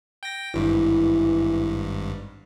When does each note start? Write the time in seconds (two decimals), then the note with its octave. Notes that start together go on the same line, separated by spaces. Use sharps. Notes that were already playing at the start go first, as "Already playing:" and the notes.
0.23 G5 A#6
0.54 G#1 G2 E3